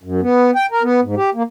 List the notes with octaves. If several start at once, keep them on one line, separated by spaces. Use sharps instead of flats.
F#2
B3
G5
A#4
B3
G#2
G4
A#3